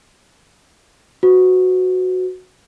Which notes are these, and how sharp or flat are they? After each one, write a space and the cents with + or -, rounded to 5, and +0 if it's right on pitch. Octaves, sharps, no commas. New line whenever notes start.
F#4 -5 B4 +35